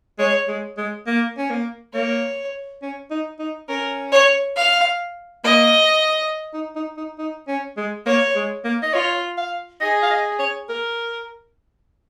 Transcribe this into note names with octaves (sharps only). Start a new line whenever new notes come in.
G#3 C#5
G#3
G#3
A#3
C#4
A#3
A#3 C#5
C#4
D#4
D#4
C#4 A#4
C#5
F5
A#3 D#5
D#4
D#4
D#4
D#4
C#4
G#3
A#3 C#5
G#3
A#3
D#5
F4 C#5
F5
G#4 D#5
F5
D#5
C#5
A#4